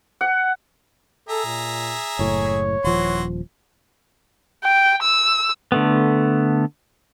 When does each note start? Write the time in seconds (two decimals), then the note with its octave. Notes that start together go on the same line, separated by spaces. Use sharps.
0.21 F#5
1.29 G#4 A4 E5 A#5
1.45 A#2
2.19 F#1 A2 C#5
2.84 D#1 E3 F3 F#4 C6
4.64 G5
5.03 E6
5.72 D3 A3 B3